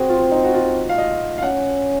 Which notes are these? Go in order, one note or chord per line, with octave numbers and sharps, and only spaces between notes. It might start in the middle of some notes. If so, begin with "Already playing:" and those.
Already playing: C4 F#4 G#4
F4
D#4
F#4
F4
F5
D#5
F5
C#4 F#5